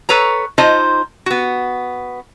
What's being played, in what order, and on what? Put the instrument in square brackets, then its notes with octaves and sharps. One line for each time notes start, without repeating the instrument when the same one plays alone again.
[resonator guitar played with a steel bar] A4 B4 C#5 A#5
D#4 F4 C5 D#5 A5
B3 F#4